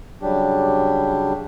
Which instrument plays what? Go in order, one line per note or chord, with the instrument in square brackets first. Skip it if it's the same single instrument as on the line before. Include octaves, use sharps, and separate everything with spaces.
[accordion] C#3 F#3 G3 D4 G4